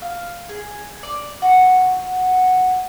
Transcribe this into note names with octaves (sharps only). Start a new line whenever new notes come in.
F5
G#4
D5
F#4